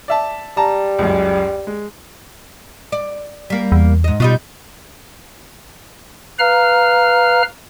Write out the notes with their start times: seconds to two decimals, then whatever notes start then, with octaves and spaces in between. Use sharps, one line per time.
0.08 D5 E5 A5
0.57 G3 A5 A#5
0.99 C#2 F#2
1.67 G#3
2.92 D5
3.50 G3 A#3
3.72 E2
4.04 G#2 D#5
4.20 B2 G3 D#4 F4
6.39 B4 F5 A#5 F6